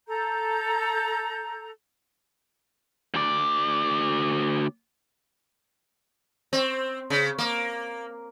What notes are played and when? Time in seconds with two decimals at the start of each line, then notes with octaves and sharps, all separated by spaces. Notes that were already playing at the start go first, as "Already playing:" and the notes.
0.08 A4 A#5 G6
3.14 D2 D5
6.53 C4
7.10 C#3
7.38 A#3